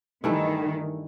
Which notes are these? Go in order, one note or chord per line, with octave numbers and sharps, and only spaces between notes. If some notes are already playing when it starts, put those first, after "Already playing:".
G2 D#3 E3 A3 E4